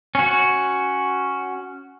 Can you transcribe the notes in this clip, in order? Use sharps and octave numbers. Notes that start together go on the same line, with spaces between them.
C#4 F#4